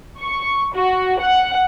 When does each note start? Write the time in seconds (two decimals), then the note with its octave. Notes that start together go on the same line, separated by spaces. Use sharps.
0.19 C#6
0.74 F#4
1.19 F#5